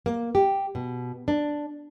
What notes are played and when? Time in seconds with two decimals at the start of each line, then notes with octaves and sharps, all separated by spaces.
0.06 A#3
0.35 G4
0.75 B2
1.28 D4